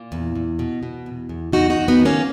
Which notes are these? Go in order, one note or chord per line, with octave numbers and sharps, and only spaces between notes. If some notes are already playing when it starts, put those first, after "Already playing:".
Already playing: A#2
E2
E2
B2
B2
E2
E2
E2 D#4 F#4
D#4 F#4
E2
B3 D#4
D#3
A#3 C#4